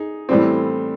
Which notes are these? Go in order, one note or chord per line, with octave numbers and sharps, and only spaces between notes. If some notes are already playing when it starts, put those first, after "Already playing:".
Already playing: D#4 G#4
A2 E3 G3 C4